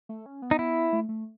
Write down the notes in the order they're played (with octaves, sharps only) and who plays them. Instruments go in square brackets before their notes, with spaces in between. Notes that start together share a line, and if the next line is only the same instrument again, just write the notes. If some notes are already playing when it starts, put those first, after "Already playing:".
[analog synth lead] A3
C#4
B3
[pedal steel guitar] D#4
E4
[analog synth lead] A3
A3